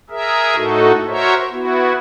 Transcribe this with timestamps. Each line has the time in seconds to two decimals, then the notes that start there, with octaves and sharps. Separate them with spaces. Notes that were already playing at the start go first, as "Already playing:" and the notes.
0.10 G#4 A#4 E5
0.55 A2 A3 D#4 F#4 A4
1.08 F#4 A#4 C5 C#5 E5
1.51 B3 E4 F#4